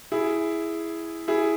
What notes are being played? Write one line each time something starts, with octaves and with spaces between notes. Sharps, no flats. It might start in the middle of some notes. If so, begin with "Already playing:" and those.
E4 G#4
E4 G#4